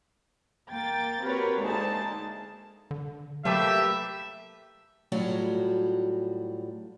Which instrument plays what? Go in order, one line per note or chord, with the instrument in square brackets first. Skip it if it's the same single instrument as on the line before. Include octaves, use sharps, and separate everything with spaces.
[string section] A#3 G5 A6
C4 F#4 G4 A#4 B4 C#5
D2 G#3 A#3 D#4 G#4 A5
[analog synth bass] D3
[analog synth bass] F#3 [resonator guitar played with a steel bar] A3 A#3 B4 [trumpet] G4 [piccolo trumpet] E5
[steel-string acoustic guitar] A2 F#3 G3 F4 F#4